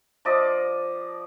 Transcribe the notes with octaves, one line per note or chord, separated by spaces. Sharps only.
F3 D5 D#5